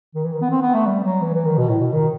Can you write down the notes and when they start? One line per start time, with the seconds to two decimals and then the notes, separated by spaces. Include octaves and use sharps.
0.15 D#3
0.24 E3
0.33 D#3
0.41 B3
0.50 C4
0.62 B3
0.74 A3
0.86 G3
1.04 F#3
1.22 E3
1.34 E3
1.46 D#3
1.58 B2
1.69 A2
1.81 B2
1.93 D#3